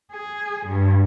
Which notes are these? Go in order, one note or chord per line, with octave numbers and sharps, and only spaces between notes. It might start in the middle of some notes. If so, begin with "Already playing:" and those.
G#4
G2